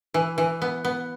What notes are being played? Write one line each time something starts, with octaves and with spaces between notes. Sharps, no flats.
E3
E3
B3
B3